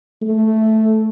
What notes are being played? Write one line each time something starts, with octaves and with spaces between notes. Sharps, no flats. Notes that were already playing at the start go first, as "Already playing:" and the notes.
A3